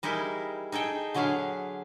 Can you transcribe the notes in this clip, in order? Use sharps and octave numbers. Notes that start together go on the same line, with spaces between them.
G3 D#4 E4 G#4 A#4
D#4 G#4 A4 G5
D3 F#3 G#4 B4 F5